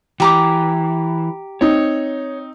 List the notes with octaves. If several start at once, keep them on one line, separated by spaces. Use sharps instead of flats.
E3 G4 A#5 D6
C4 D#4 C#5